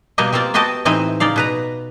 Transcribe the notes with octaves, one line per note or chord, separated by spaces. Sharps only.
B2 G3 A#3 G4 D#5
G3 A#3 C4 F4 D5
B3 F#4 G4 D#5 G5 A5
A2 E3 C4 D#4 D#5
C#3 D#4 D5 F5
B2 B4 A#5